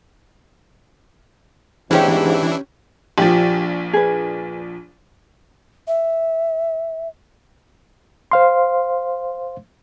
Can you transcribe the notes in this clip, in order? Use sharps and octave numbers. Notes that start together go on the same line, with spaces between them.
E2 G#2 E3 C#4 D4 E4 G4 C#5
A#1 F3 G4
G#4 B4
E5
C5 F5 C6